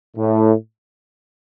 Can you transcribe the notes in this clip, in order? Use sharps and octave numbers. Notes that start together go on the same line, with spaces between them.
A2